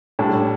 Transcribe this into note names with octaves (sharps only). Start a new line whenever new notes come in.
A2 G3 D4